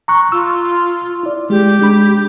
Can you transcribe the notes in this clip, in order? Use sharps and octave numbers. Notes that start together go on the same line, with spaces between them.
A#5 C#6 F#6
F4 E6
E4 D5
G#3 G4
G#3 D4 B5